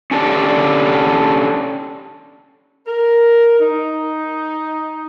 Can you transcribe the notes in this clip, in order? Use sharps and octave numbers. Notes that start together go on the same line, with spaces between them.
C#4 D4 G4 A4 C5 D5
A#4
D#4